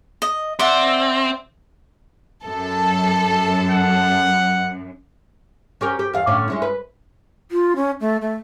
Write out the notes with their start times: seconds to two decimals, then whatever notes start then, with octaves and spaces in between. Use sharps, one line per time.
0.22 D#5
0.59 C4 D5 E5 F#5
2.45 F#2 A4
3.70 F#5
5.81 C#4 G4 A#4
5.99 G4
6.13 E2 F5
6.27 A2 D3 C#4
6.48 G#3 C#4 E4
6.62 B4
7.51 F4
7.76 C#4
8.01 A3
8.21 A3